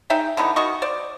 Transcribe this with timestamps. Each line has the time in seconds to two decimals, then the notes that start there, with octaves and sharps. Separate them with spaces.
0.10 D#4 G#4 E5 G5
0.37 D3 E3 B3 D#4
0.56 D#3 F#4 D#5 C#6
0.82 C5 D5